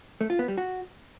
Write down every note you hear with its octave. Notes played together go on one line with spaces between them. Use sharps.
A3
F4
B3
G3
F#4